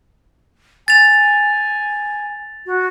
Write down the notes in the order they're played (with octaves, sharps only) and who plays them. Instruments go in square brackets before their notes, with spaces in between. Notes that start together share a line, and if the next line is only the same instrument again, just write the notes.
[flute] G#5 [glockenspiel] A6 F7
[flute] F#4